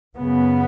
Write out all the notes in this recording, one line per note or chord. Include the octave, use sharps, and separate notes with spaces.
F#2 C#3 B3